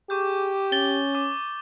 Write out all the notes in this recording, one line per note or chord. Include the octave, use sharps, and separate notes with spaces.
G4 G#4 C#6 D6 G6
C#4 A6 G7
C#6 D6